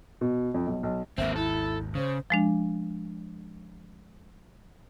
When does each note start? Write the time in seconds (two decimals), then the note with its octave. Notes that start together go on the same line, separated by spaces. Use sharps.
0.21 B2
0.54 F2
0.67 B1
0.83 B1
1.18 G#1 D#2 A#3 C4 E5
1.36 E4 A4
1.95 C#3 C5
2.30 F3 G#3 D4